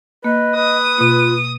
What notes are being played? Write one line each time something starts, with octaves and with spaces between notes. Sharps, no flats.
A#3 B4 D#5
B4 D#6
B2 A#3 F4